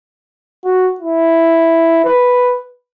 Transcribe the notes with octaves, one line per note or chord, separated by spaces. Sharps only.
F#4
E4
B4